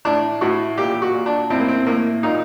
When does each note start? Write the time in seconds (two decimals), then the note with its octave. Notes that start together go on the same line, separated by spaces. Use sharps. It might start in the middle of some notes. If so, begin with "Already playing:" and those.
0.05 A2 D4
0.41 A2 F#4
0.78 A#2 G4
1.02 F#4
1.14 A#2
1.26 D4
1.50 A2 C4
1.60 A#3
1.68 C4
1.86 A2 A#3
2.23 A#2 D#4